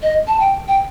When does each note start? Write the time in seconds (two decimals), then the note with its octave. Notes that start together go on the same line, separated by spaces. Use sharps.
0.03 D#5
0.28 A5
0.40 G5
0.68 G5